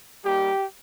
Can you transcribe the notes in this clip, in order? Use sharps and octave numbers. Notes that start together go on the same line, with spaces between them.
G3 A#3 D#4 G4